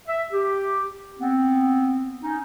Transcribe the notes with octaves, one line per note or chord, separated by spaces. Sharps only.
E5
G4
B3 C4
C#4 D#4